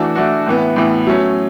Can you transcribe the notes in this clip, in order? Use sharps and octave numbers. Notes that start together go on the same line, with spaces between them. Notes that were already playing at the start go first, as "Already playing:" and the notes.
Already playing: E3 A3 D4 F#4
E3 A3 D4 F#4
A2 E3 B3
A2 E3 B3
F#3 A3 C#4